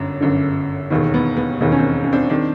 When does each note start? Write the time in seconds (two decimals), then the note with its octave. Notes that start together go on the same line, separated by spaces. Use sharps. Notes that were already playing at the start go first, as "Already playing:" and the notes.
Already playing: G1 F#2
0.21 G1 F#2 D3
0.90 E1 D#2 D#3 B3
1.14 B3
1.37 B3
1.60 E1 D#2 D#3 B3
1.72 C#4
1.78 C4
2.04 C#4
2.12 C4 D4
2.30 D#3 C4 D4